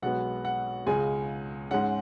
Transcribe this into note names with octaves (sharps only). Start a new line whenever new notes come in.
B1 B2 G#3 B3 F#5
F#5
C#2 C#3 G#3 G#5
G#2 G#3 C#4 F#5